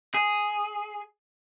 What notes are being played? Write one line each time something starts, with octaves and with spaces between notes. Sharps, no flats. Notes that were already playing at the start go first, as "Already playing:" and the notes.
G#4